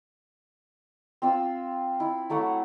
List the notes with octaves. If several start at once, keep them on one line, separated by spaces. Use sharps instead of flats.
C4 F4 E6
E4
F#3 A3 E4 F#5